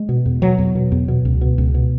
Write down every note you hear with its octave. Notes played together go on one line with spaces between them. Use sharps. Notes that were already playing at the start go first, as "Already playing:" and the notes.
Already playing: G#3
B2
E2
B2 F#3
E2
B2
E2
B2
C#2
B2
C#2
B2